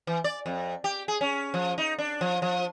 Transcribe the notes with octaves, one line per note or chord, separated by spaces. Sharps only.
E3
D5
F2
G4
G#4
C#4
F3
D#4
D4
F3
F3